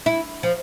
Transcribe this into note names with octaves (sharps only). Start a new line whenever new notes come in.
E4
F3